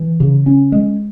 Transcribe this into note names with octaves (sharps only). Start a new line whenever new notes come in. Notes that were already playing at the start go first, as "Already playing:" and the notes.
Already playing: E3
C#3
C#4
G#3